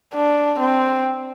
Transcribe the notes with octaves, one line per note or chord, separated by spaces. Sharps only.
D4
C4